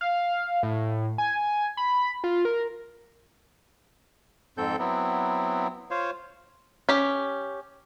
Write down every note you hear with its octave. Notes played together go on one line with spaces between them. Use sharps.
F5
A2
G#5
B5
F4
A#4
F2 G#2 C4 A4 G6
F#3 B3 C4 E4
F4 C5 C#5 F5
C#4 G4